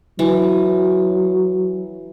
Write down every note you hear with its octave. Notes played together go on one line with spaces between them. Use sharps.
E3 F#3